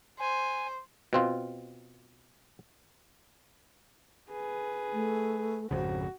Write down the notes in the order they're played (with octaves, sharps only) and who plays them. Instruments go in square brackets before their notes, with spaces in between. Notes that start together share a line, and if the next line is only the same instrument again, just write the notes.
[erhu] C5 [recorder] G#5
[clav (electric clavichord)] B2 C4 F4
[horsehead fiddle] G#4 B4
[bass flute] A3
[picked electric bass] G#1 F2 C#3 [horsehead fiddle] F#4 [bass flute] C5